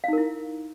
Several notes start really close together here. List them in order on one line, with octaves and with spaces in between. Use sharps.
F5 D#4 A#4 E4